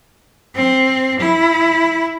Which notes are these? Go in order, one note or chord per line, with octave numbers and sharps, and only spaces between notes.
C4
E4